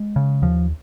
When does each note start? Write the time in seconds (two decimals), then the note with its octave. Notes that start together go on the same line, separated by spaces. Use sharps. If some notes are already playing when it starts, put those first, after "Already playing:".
Already playing: G#3
0.16 C#3
0.42 D#2 F3